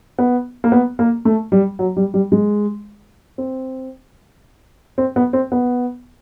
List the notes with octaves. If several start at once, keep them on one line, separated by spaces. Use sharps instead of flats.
B3
A#3
B3
A#3
A3
G3
F#3
G3
G3
G#3
C4
C4
B3
C4
B3